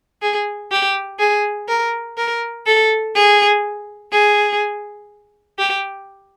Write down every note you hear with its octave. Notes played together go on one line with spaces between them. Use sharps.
G#4
G4
G#4
A#4
A#4
A4
G#4
G#4
G4